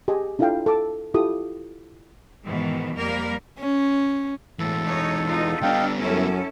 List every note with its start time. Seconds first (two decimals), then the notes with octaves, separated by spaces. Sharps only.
0.08 G4 G#4 D#5 G#5
0.39 D4 E4 F4 A4 F5 G5
0.66 A4 D6 E6
1.14 E4 F4 G4 A4 D#6
2.45 G#2 B2 D#3 E3
2.95 F2 G3 A#3 A#4
3.59 C#4
4.59 A2 E3 G#3 A4
4.89 D#4 C#5
5.28 E2 D#4 F4
5.63 G3 B3 D4 D#5 F5 G5
6.00 F#2 C#4 E4 A4